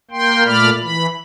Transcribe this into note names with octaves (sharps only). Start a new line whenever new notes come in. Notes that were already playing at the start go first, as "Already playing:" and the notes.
A#3 G5 C6
A#2 A3 D5 B5 F6
E3 B5